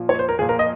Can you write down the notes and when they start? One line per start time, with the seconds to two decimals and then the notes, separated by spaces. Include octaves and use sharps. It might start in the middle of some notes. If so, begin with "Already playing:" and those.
Already playing: A#2 F3
0.09 C#5
0.19 C5
0.29 A#4
0.39 A#2 F3 G#4
0.49 A#4
0.59 D#5